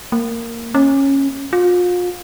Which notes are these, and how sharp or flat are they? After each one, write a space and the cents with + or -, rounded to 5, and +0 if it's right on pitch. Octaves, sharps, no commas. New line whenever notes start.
A#3 -10
C#4 -15
F4 +35